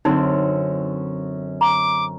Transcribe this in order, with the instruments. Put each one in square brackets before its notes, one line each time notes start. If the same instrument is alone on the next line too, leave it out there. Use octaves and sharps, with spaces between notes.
[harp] F#2 D3 C4 [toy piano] D#4
[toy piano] A#5 [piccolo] D6